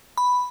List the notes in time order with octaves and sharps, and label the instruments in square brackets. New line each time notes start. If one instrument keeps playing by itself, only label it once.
[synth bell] B5